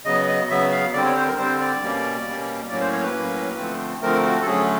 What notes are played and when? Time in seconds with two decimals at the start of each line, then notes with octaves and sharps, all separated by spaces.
0.05 C#3 F#3 B3 D#5
0.28 D#5
0.50 C#3 F#3 B3 E5
0.71 F5
0.93 D3 G3 C4 D5
1.05 C#5
1.16 C5
1.26 A#4
1.37 D3 G3 C4 C5
1.60 D5
1.82 B2 G3 A#3 C#4
2.26 B2 G3 A#3 C#4
2.69 A2 F#3 A#3 C#4 D5
2.80 C5
2.93 C#5
3.03 B4
3.14 A2 F#3 A#3 C#4
3.57 D3 F3 A3 C4
4.02 D3 F3 A3 C4 A#4
4.25 F#4
4.42 A4
4.46 D3 F#3 A3 C#4 G#4